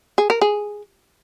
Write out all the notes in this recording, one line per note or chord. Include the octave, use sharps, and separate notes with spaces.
G#4
A#4
G#4